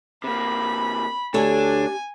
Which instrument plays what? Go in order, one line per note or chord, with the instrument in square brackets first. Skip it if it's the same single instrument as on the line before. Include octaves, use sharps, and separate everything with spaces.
[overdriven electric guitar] C3 A#3 [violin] B5
[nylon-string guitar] D2 A4 C#5 [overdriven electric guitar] D4 [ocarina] G4 [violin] G#5